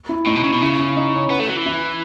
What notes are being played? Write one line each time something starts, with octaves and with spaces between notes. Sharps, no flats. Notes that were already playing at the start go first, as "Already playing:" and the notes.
E4
A2 D#4
B2
C#3
B2
C#3 E4
E4
D#4
C#4
B3
A3
F#3
E3
E4